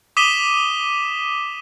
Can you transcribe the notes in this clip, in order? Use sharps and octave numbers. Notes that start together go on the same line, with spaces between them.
D6 D#6 B6 D#7 E7 G7